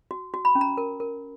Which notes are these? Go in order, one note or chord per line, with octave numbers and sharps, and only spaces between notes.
F#4
F#4
B5
C#4
A#5
A#4
A#4